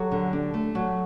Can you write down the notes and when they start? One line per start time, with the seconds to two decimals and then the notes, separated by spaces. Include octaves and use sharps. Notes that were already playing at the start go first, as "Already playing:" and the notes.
Already playing: F#3 G4 A4
0.11 D3
0.33 D4
0.54 A3
0.75 F#3